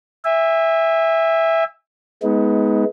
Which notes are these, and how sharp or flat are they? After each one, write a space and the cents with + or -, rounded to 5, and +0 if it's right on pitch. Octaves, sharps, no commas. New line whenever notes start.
E5 +0 G#5 -35
G#3 +15 B3 +0 D#4 +30